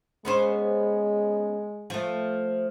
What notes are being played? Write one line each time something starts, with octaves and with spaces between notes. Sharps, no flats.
G#3 B3 C#4 C5
F3 A3